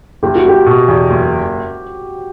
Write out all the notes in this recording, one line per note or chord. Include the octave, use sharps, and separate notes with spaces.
F#1 G4
F#4
G3 G4
B2
E2
F#1